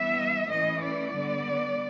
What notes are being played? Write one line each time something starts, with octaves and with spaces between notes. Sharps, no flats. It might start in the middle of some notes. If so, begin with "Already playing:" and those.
Already playing: E3 G3 B3 E5
E3 A3 C#4 D#5
D5
D3 G3 B3